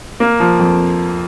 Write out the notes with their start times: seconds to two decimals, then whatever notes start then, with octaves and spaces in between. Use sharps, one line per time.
0.20 A#3
0.40 F3
0.59 F2